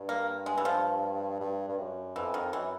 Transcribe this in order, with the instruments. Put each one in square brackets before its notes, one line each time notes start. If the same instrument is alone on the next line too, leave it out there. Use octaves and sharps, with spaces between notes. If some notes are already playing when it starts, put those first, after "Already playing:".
Already playing: [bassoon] G2
[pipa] A#3
G#3
E3
F3
[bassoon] G2
G2
F#2
[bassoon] F2 [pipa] E3
[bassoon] F2 [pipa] D#3
[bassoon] F#2 [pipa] E3